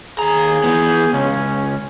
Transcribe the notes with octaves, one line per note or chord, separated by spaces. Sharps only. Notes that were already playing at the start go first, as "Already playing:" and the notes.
D#2 G#4 A#5
E3 B3
C#2 C#4